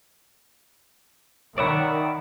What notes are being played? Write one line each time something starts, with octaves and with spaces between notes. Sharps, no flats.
D#3 C#5 D5 E5 F#5 B5